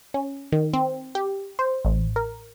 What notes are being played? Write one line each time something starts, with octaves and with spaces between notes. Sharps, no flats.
C#4
D#3
C4
G4
C5
A1
A#4